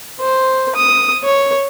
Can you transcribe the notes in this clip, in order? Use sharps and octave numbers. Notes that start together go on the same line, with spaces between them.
C5
D#6
C#5